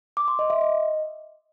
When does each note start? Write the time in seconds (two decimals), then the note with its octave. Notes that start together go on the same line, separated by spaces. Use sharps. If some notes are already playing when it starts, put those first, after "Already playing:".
0.17 D6
0.28 C6
0.39 D#5
0.50 E5
0.61 D#5